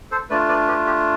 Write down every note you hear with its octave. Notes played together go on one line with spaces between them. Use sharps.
A4 C5
A3 D4 F4 B4 D5
B4 D5
G4 B4
G4